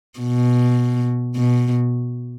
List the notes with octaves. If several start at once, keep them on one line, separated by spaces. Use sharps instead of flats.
B2
B2